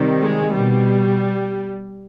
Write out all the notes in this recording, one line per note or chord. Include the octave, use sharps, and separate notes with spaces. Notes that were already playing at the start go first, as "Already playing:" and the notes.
Already playing: C3 D#3 G3
G#3
B2 G3